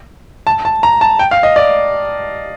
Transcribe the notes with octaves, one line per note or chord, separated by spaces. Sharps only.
A5
A5
A#5
A5
G5
F5
D#5
D5